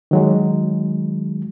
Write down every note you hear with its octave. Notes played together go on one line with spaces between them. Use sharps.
D#3 F#3 G#3